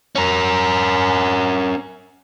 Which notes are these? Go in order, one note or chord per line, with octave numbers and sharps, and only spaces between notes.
C#4 A#4